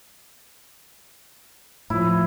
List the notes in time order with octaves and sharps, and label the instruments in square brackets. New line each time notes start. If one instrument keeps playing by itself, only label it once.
[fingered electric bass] A2 F3 [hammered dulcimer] E4